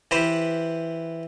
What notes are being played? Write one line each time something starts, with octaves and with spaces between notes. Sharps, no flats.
E3 G4 B4 C5